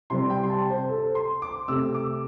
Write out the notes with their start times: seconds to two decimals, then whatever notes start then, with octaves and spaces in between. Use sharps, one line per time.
0.10 C3 G3 C4 C6
0.30 G5
0.43 C6
0.50 A5
0.70 C5
0.89 A4
1.15 C6
1.42 D6
1.68 C3 A3 C4 E6
1.94 D6